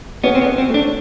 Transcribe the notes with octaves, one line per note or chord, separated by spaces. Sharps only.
B3 C#4
C4
B3
C#4
C4
A3
D4